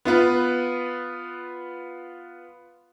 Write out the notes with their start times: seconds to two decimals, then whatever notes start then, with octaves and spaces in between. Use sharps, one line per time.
0.05 B3 F4 B4